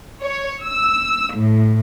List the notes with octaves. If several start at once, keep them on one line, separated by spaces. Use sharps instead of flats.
C#5
E6
A2